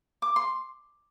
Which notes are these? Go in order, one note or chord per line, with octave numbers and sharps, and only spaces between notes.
D6
C6